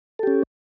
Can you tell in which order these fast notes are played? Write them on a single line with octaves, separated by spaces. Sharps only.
A4 G4 C#4